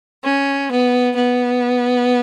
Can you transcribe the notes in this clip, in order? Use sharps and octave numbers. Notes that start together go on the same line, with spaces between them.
C#4
B3
B3